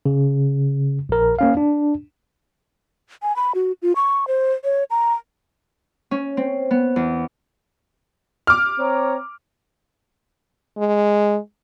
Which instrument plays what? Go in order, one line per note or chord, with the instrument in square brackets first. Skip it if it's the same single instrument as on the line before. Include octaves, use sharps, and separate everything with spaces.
[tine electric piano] C#3
A#1 A#4
A#3 C#4 F5
D4
[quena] G#5
B5
F#4
F4
C#6
C5
C#5
A#5
[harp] C#4
C4
B3
E2
[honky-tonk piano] D6 F6
[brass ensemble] C4 C#5 A#5
[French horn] G#3